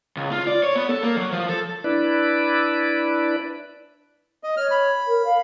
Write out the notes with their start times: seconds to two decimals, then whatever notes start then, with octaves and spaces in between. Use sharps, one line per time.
0.17 C#2
0.31 F4
0.47 D5
0.63 C#5
0.76 B3
0.89 A4
1.03 A#3
1.16 F#3
1.32 F3
1.49 A4
1.84 D4 E4 B4 D5
4.43 D#5
4.57 C#5 F6
4.71 B5
5.07 A#4
5.25 F5